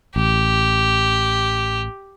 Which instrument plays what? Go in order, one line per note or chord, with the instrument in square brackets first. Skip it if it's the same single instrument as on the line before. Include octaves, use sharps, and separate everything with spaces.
[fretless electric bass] A1 [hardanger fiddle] G4